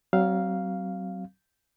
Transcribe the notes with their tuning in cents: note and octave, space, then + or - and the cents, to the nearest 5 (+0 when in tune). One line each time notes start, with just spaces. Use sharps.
F#3 +35 C4 +0 F5 +0